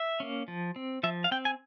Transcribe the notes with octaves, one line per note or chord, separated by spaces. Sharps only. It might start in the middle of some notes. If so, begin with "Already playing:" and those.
Already playing: E5
A#3 C#4
F3
C4
F3 E5
F5
C4 G5
G#5